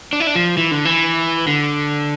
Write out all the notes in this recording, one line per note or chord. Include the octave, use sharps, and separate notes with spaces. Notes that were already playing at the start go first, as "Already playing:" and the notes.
D4
E4
D4
F3
E3
D3
E3
D3